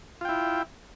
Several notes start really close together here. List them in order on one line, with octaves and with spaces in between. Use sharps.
F4 G5 E4